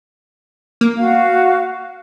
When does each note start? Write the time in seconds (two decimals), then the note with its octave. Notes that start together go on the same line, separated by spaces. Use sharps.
0.81 A#3
0.97 F#4 F5